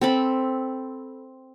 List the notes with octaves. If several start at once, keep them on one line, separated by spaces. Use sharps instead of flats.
C4 A4 B5